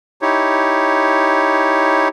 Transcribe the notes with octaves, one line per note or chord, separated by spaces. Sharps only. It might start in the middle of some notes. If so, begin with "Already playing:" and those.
D#4 E4 G4 C#5